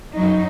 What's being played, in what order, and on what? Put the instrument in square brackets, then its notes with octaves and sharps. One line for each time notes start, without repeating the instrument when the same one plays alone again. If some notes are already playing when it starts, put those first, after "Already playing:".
[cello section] F#2 F#3 D#4